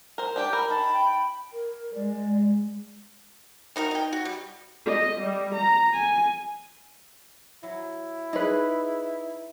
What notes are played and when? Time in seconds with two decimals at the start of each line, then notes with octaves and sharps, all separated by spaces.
0.18 A#4 C5
0.36 D4 G4 G5
0.53 A#4 B5
0.70 D#3 A5
0.93 G5
1.53 A#4
1.95 G#3 D5
3.76 D#3 D#4 F#4 A#4
3.91 D#4 G5
4.13 F#4
4.25 G3
4.86 D#5
5.20 G3
5.54 A#5
5.93 G#5
7.63 F#3 E4
8.33 D#4 G#4 B4 C6